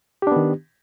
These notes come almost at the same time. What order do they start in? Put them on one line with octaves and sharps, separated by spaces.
G4 D4 B3 D#3